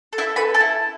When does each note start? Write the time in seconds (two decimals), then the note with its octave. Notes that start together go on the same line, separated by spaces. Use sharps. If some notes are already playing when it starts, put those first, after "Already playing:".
0.13 A4
0.18 E4 E5
0.36 A4 B4 B5
0.54 A4 A5
0.60 E4